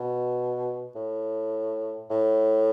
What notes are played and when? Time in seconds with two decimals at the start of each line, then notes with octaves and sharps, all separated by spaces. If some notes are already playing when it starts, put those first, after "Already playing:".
Already playing: B2
0.95 A2
2.10 A2